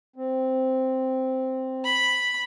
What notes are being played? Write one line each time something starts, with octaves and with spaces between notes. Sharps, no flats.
C4
B5